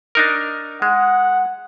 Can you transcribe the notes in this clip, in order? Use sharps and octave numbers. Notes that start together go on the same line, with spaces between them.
D4 D#4 A#4
G#3 F#5